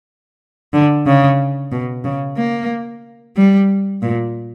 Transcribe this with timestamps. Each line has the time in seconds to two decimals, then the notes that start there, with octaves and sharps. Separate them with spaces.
0.73 D3
1.06 C#3
1.72 B2
2.04 C#3
2.37 A#3
3.36 G3
4.02 A#2